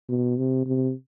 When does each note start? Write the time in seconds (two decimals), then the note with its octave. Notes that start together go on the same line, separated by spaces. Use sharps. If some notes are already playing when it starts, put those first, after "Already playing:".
0.09 B2
0.38 C3
0.66 C3